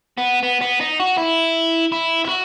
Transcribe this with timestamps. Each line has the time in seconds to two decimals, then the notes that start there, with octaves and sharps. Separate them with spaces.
0.18 B3
0.43 B3
0.62 B3
0.81 D#4
1.00 F#4
1.18 E4
1.92 E4
2.25 E4
2.29 F#4